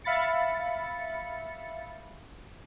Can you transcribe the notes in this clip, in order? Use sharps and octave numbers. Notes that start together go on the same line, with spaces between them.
E5 F5 B5 A6 C#7